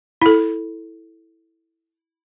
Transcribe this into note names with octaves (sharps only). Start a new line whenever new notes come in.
E4 A4